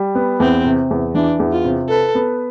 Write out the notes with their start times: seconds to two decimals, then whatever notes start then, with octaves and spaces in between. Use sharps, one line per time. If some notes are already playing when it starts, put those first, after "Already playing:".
Already playing: G3
0.15 B3
0.40 E2 C4
0.65 C3
0.91 E2
1.15 E3 D4
1.39 E2
1.53 F4
1.64 C3
1.89 A4 B4
2.15 B3